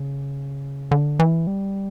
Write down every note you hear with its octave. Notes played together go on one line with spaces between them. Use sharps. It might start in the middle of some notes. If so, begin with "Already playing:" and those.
Already playing: C#3
D3
E3
G3